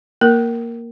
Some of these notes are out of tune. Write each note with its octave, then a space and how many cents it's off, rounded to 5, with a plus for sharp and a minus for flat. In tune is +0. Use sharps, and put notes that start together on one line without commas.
A#3 +0 A#4 +0